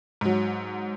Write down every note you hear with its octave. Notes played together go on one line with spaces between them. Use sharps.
G#2 F#3